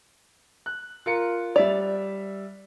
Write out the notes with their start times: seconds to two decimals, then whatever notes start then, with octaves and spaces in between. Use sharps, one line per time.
0.66 F#6
1.06 F4 A#4 C#7
1.56 G3 D5 E5 F7